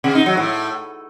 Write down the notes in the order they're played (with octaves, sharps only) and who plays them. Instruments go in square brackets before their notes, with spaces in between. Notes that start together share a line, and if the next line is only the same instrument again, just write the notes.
[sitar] C3
D#4
F#3
A2